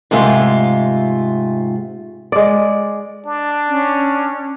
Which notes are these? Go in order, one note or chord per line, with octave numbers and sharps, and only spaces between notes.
G#2 C3 G#3 A3 F4
G#3 D5
D4
C#4